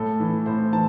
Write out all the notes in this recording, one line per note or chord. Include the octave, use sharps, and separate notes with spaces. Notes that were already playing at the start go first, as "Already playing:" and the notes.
Already playing: A2 A4
E3
A2 C5
E3 A5